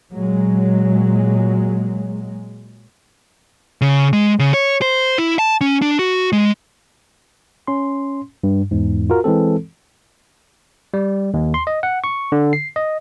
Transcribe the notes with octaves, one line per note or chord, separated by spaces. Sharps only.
A#2 F#3 G#3
C#3
G#3
C#3
C#5
C5
E4
A5
C#4
D4
F#4
G#3
C#4 C6
G2
E2 G#2
F4 F#4 A#4
E3 G#3 C4 A4
G3
D#2
C6
D#5
F#5
C#6
D3
C7
D#5